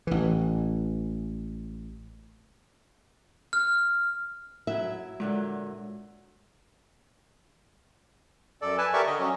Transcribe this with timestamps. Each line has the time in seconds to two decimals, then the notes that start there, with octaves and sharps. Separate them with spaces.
0.07 A1 E3
3.53 F6
4.67 F#3 E4 E5
5.20 A#2 D3 F#3 G#3
8.62 F#2 A4 D5
8.78 B4 G#5 A5
8.93 G4 A4 A#4 D5 E5 C#6
9.07 D3 D#5
9.19 F#3 C#4